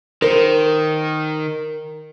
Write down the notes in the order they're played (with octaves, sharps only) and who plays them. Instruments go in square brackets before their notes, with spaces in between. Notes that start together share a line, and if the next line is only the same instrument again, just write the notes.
[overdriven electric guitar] D#3 [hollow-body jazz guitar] A#4 C5